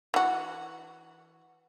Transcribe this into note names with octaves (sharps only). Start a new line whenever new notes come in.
E3 F#4